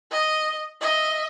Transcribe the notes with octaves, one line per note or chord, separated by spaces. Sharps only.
D#5
D#5 E5